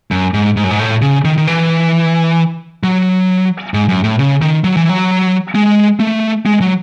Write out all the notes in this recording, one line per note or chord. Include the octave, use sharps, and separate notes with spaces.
F#2
G#2
G#2
F#2
G#2
A2
C#3
D#3
D#3
E3
F#3
G#2
F#2
A2
C#3
D#3
F#3
E3
F#3
G#3
A3
G#3
F#3